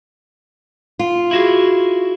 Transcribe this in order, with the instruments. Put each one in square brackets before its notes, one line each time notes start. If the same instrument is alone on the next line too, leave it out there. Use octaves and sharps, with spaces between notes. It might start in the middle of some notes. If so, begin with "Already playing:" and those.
[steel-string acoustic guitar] F4
[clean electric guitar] E4 F#4 G#4